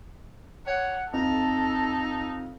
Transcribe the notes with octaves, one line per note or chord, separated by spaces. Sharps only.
C#5 F#5
F2 D#4 A4